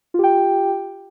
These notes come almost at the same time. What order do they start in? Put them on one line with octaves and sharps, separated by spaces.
F4 G4 G5